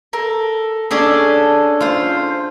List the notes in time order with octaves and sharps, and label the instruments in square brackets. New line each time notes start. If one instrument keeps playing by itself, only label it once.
[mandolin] A4 A#4
[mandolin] C#4 A4 [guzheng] D4 G#4 D#5
[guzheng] F4 C5